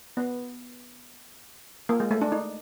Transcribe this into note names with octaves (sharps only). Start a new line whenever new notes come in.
B3
A#3
G#3
A3
D4
D#4